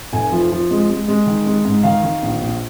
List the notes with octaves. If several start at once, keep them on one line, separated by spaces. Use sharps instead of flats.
F1 G#5
F3
F3
G#3
G#3
G#3
D#3
G#3
G#2
D#3 F5
D#3
A#1
A#1